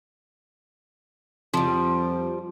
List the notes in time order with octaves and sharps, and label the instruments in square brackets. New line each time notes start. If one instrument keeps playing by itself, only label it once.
[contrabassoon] F2 [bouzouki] F3 G3